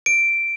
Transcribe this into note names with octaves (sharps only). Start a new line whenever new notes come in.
D7